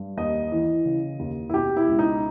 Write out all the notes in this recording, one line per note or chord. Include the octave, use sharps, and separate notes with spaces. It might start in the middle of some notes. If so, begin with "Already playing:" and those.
Already playing: G2
D#2 D#5
E3
C#3
D#2
E4
B2 G4
E4
C#2
D#4